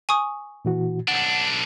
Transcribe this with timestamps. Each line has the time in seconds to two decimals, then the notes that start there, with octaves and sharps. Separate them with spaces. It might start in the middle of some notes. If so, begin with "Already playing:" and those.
0.09 G#5 C#6 D#6
0.65 A#2 E3 F#4
1.08 B1 D4 F#5